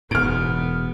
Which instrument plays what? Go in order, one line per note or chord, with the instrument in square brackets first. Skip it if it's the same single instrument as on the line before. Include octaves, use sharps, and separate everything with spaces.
[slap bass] E1 G#2 [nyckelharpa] B3 [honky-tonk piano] F6 D7